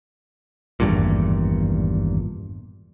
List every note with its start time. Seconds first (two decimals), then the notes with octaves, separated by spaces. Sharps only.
0.80 G#1 E2 G2 A#2